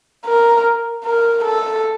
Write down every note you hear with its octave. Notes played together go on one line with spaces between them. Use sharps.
A#4
A#4
A4